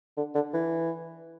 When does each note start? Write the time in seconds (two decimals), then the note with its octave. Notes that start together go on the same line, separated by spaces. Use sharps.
0.17 D3
0.35 D3
0.53 E3